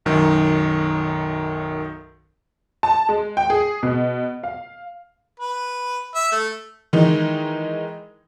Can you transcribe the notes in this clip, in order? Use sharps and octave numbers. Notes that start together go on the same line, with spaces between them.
B1 F#2 D#3 F#3
A5
G#3
G5
G#4
B2
F5
B4
E5
A3
D#3 E3 G#3 D#4